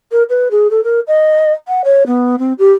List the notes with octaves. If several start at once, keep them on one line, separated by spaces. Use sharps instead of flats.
A#4
B4
G#4
A4
A#4
D#5
F#5
C#5
B3
C4
G4